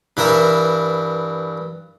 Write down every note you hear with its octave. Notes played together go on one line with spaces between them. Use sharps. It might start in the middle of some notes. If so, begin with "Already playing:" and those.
G2 E3 A#4 E5 A#5